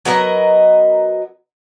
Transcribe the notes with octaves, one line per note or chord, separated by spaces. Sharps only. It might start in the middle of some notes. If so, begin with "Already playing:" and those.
F#3 B3 A#4 D#5